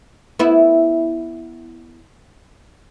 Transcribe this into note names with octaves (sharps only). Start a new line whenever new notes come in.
B3 E4